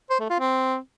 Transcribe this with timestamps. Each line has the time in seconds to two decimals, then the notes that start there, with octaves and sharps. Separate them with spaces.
0.10 C5
0.20 A3
0.30 F4
0.40 C4